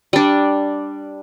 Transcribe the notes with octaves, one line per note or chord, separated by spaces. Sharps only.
G3 D4